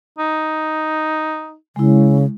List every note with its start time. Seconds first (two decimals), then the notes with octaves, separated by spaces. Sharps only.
0.19 D#4
1.76 C#3 G#3 E4